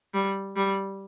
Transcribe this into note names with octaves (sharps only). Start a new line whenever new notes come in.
G3
G3